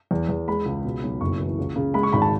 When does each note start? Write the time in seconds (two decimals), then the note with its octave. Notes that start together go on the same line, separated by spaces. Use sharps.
0.11 E2
0.29 E2
0.48 G#3 B5
0.65 C#2
0.84 B2
1.03 B1
1.21 F#1 C#6
1.40 E3
1.58 C#2
1.76 C#3
1.94 G#3 B5
2.03 C#6
2.12 G#1 B5
2.22 A5